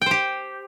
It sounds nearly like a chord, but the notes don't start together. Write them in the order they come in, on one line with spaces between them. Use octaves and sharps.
G5 C5 G4